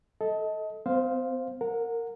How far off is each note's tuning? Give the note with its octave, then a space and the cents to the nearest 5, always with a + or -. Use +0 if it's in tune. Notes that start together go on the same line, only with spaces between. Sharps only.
A4 -5 D#5 +30
C4 -45 C5 +0 F5 +0
A#4 -15 F#5 -30